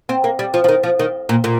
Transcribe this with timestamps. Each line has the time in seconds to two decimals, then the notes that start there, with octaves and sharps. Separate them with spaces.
0.09 C4
0.24 A#3
0.39 G3
0.54 F3
0.64 F3
0.68 D#3
0.83 F3
0.99 D#3
1.29 A#2
1.44 A#2